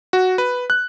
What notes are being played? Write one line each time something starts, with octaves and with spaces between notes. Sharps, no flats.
F#4
B4
F#6